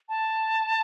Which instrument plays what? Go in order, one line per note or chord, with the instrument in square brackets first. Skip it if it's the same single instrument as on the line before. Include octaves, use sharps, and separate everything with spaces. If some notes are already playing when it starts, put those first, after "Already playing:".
[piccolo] A5